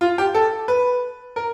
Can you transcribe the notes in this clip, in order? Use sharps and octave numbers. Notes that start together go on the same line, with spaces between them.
F4
G4
A4
B4
A#4